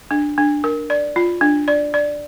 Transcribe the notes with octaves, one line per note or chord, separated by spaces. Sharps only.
D4
D4
A#4
D5
F4
D4
D5
D5